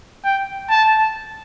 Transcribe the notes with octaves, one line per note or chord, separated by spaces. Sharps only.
G5
A5